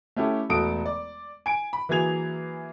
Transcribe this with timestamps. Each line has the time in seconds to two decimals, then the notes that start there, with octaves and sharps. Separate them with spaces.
0.16 A3 C#4 E4 G4 A4
0.49 E1 A3 F#4 A4 D#6 D7
0.86 D5
1.46 G#5 D7
1.73 B5
1.89 E3 F#3 A#3 G#4 G#6 F7